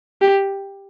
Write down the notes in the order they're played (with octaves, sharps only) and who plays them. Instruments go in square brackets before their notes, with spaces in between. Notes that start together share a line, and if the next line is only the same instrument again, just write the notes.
[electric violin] G4